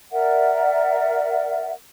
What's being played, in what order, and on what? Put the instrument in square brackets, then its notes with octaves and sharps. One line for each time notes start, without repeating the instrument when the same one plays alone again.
[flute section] A#4 D5 E5 F#5